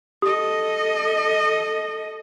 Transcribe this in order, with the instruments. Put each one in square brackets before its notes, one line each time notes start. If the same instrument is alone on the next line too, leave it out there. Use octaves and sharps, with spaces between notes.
[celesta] G4 D#6 [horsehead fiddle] A4 D#5